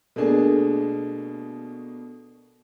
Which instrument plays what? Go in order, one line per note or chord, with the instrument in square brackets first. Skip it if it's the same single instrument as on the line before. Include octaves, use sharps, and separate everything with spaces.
[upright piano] B2 A3 A#3 D4 G#4